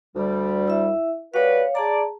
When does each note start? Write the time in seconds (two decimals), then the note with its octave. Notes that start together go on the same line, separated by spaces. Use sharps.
0.15 D2 G3
0.68 E4 E5
1.34 G3 F#4 B4 C#5 F5
1.75 G#4 D5 A5 A#5